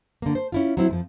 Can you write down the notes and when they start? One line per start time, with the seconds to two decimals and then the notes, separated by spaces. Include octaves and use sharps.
0.22 D3 A#3
0.35 C5
0.52 C#4 E4 F4
0.77 F#3 C4 E4
0.89 F2 E3 F3